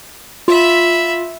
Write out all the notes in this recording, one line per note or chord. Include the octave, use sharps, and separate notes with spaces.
F4 E5 B5